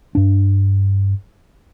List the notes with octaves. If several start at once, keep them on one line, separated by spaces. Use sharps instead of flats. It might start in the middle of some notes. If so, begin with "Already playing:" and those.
G2 D4